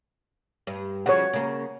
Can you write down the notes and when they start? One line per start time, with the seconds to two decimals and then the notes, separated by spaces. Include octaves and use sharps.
0.67 G2
1.06 C#3 F3 C#5 F#5
1.33 C#3 A#3